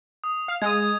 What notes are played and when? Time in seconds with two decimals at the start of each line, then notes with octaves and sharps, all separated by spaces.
0.24 D#6
0.48 F5
0.62 G#3 D#6 G#6